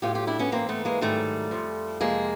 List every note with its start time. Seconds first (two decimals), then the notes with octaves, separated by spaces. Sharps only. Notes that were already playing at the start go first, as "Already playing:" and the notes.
0.02 A2 F#3 F4 G4
0.15 F4 G4
0.27 D4 E4
0.39 B3 C#4
0.52 G#2 E3 A#3 C4
0.69 A3 B3
0.85 G#3 A#3
1.01 G#2 D#3 F#3 G3 A3
1.51 F2 D3 F3
2.00 F2 C3 F3 G#3 A#3